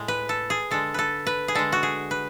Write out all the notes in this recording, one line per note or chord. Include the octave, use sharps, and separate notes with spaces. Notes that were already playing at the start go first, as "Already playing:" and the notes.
Already playing: A2 G#3
B4
A4
G#4
D3 G#3 A4
A4 B4
B4
G#4
D3 G#3 A4
F#4
G#4
B4